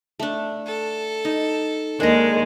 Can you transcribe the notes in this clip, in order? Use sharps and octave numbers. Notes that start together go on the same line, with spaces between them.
A3 D4
A4
D#4
D#2 G#3 D4 A#4 D#5